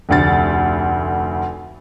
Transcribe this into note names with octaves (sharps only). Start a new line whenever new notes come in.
F1 D2 A6